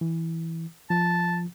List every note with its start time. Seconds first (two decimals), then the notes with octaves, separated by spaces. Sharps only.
0.01 E3
0.90 F3 A5